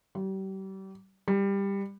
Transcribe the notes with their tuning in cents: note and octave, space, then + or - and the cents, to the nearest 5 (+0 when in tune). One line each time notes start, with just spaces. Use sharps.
G3 -35
G3 +15